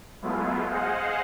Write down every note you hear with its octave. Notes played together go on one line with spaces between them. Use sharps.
F#3 G#3 A3 B3 E4 F4
G#4 C5 D#5 F5 F#5